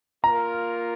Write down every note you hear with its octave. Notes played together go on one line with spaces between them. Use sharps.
A#3 F4 A#4 A#5